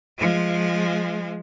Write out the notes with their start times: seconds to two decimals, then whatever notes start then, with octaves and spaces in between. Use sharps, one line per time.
0.18 F3 G#3